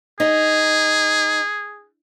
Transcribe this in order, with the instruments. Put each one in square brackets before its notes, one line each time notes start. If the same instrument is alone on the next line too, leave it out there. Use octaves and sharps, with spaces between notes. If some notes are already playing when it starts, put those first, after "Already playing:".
[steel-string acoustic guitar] D#4 [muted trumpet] G#4